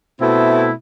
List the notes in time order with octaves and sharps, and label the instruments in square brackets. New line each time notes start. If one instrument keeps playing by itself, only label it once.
[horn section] B2 A3 C4 E4